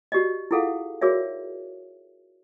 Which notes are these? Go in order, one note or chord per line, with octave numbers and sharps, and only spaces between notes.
F#4 G4 D5 D#5
E4 F4 G#4 A4 F5 F#5
F#4 G#4 A#4 C#5 D5 E5